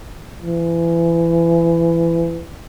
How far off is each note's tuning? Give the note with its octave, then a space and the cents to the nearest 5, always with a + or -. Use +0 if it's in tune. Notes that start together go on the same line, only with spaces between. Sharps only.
E3 +25